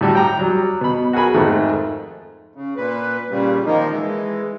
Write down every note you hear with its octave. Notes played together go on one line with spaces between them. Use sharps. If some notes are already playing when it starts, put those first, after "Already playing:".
A2 G3 F#4
G5 A#5
F#3 G3
B2 B5
F#4 G#4 A#4 G#5 B5
F2 G#2 D#3 A3
C#3
A#2 B4
A#2 C#3 G3
D#3 F3 A#3 D#4
E3 G#3